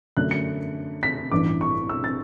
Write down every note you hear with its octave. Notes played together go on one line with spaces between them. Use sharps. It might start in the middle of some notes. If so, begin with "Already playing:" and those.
F#2 D3 A3 D4 F#6
C#7
B6
A1 G2 E3 B3 D4 D6
C#6
E6
A6